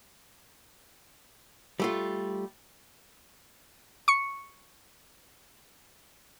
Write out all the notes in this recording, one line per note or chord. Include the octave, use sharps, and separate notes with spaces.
G3 A3 F4
C#6 C#7